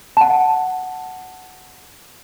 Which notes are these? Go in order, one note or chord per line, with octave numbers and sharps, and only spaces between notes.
F#5 A5